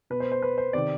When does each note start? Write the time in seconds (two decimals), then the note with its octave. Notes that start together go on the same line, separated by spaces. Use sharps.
0.10 B2 B4
0.20 C5
0.32 C5
0.42 B4
0.58 C5
0.73 C3 D#3 D5